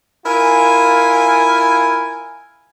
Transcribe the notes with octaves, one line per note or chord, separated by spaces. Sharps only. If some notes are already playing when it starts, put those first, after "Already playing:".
E4 F4 A#4 G#5